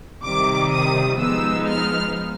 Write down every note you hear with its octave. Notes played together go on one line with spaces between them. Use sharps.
C3 D#3 G3 D6
D#6
F3 G#3 B3 D#4 E6
F6